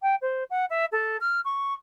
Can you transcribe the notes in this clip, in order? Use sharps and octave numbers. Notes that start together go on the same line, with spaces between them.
G5
C5
F#5
E5
A4
F6
C#6